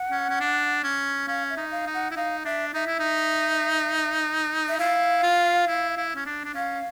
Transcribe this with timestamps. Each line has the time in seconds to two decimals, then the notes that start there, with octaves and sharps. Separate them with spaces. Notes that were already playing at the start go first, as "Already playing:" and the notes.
Already playing: F#5
0.11 C#4
0.30 C#4
0.40 D4
0.84 C#4
1.28 C#4 F5
1.50 E5
1.57 D#4
1.71 F5
1.86 D#4
1.94 F#5
2.11 E4
2.16 D#4 F5
2.45 D4 E5
2.74 D#4 E5
2.87 E4
2.99 D#4
4.69 E5
4.78 E4 F5
5.23 F4
5.67 E4
5.97 E4
6.16 C#4
6.26 D4
6.45 D4
6.54 C#4 F5